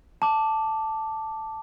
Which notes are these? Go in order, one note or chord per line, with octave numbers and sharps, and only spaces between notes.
A5 D6